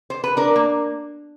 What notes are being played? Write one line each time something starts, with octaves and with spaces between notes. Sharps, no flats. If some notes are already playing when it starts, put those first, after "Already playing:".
C5
B4
D4 A#4
A#3